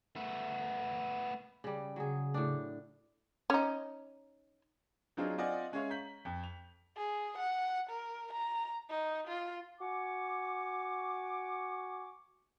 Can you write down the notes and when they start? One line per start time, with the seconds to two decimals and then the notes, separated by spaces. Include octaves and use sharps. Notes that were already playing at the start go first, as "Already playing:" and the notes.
0.16 A3 B3
1.64 C#3 G3
1.96 C#3 F#3 G#4
2.34 A2 D4
3.50 C#4 D#4
5.17 F#3 C4 D4 D#4 F4 G#4
5.38 C4 F4 D5 D#5 F#5 G#5
5.72 G#3 C#4 G#4 C#5 E5 F5
5.90 A#5 G6 B6 F#7
6.25 F2
6.44 F7
6.97 G#4
7.38 F#5
7.90 A#4
8.33 A#5
8.90 D#4
9.28 F4
9.80 F#4 G#5 C#6 D6